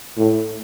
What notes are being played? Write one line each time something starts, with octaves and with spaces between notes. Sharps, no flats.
A2